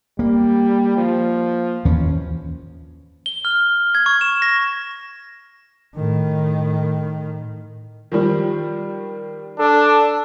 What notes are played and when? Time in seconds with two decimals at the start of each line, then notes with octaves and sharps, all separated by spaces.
0.19 G3 A#3
0.97 F3
1.85 D#2 E3 C#4
3.26 G7
3.45 F6
3.95 G#6
4.06 C#6
4.21 E7
4.42 A#6
5.95 A2 D#3
8.12 D#3 F3 G3
9.59 D4 A4